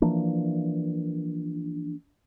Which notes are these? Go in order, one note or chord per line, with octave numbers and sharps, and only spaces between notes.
E3 F3 A#3 D4